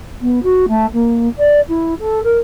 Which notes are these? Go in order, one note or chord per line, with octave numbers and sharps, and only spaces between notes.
B3
F#4
A3
A#3
D5
E4
A4
A#4